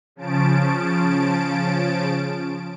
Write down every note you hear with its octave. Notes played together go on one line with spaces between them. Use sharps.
C#3 F3 C#4 A5 D7